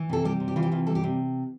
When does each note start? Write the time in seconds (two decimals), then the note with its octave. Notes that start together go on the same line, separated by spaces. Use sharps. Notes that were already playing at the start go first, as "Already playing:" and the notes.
Already playing: E3
0.09 C3 A4
0.25 G3 G4
0.40 C3
0.48 G4
0.56 E3 F4
0.63 G4
0.72 C3 F4
0.87 G3 A4
0.95 G4
1.03 C3